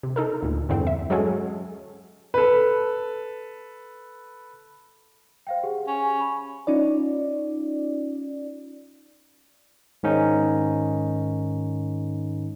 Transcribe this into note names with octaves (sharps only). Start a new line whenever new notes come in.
C3
D#4 A4 A#4
D2 A#2
E2 G2 D3 C4
E5
F#3 G#3 C#4 F#4 G#4 A4
A4 B4
C5 F5 G5
G4 G#4 F#5
C#4
B5 C#6
C#4 D#4 F4 D5
G#2 D#3 C#4 D#4